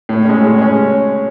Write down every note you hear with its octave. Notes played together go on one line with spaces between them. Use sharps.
A2
G#3 C#4
A2
G#3 C#4